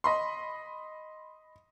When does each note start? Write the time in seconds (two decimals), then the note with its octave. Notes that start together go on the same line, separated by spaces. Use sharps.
0.04 D#5 B5 C6